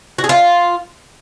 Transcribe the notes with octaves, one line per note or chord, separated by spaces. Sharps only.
F#4
G#4
F4